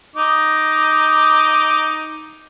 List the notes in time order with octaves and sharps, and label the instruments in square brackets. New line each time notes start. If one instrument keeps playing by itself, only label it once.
[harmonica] D#4 D6